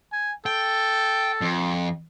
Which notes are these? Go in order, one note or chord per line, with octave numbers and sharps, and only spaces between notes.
G#5
A4 G5
F2